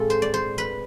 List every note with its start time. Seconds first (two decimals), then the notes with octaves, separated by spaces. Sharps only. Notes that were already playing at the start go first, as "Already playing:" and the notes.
Already playing: A2 G#3 C4 F4 A4
0.10 C5
0.22 D5
0.34 C5
0.58 B4